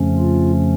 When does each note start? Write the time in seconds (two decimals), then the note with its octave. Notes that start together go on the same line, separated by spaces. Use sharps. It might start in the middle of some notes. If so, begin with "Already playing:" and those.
Already playing: F2 C#3 F3 A3 C#4
0.17 F4